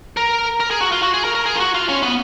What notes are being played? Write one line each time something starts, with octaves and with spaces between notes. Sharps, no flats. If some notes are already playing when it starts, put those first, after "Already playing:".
A#4
A#4
G#4
F#4
F4
F#4
G#4
A#4
A#4
G#4
F4
F#4
F4
C#4
B3